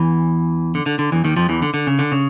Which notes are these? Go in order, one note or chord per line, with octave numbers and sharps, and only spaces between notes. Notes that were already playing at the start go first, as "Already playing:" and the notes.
Already playing: E2 E3
D3
D3
D3
E2 E3
D#2 D#3
F2 F3
E2 E3
D3
D3
C#3
D3
C#3